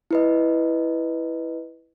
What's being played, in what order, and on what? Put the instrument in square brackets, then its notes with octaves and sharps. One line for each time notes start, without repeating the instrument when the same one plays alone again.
[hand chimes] E4 B4 D#5